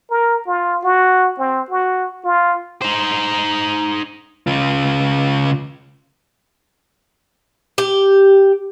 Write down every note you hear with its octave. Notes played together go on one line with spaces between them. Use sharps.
A#4
F4
F#4
C4
F#4
F4
D#4 C5
C#3 F4
G4